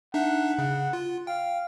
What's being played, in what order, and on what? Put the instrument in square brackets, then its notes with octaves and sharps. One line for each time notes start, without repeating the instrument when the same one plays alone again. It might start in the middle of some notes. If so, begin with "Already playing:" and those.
[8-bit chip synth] D4 D#4 E5 [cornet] F#5
[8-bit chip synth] C#3
F4
[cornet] F5 [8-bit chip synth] G5